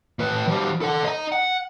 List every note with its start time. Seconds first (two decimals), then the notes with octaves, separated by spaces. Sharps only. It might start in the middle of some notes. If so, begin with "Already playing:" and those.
0.19 A2 B4
0.47 F3 G3
0.81 A4 F#5
1.04 D#5 A#5
1.32 F#5